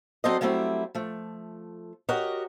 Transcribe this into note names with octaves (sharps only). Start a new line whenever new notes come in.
F#3 C4 A4 C5 D5 D#5
F#3 G3 A3 C4 E4
F3 A3
F#4 G4 A#4 C#5 D#5